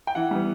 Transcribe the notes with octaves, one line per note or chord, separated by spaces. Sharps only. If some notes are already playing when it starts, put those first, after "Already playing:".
G5
E3 F#5
G3 B3